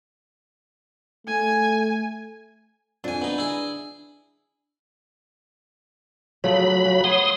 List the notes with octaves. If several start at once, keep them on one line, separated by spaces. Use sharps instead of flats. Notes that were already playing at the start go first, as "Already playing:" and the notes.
A3 G#5
F2 D4 G#5
B3 D#4
E4 G#4
C#3 F3 F#3 A3 B5
C#3
B3 C#5 C6 D#6